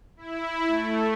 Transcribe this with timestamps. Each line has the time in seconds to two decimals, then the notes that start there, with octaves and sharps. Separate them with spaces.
0.17 E4
0.68 A3